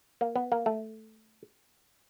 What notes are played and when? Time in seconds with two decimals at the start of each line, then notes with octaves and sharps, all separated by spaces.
0.21 A#3
0.36 B3
0.52 A#3
0.66 A3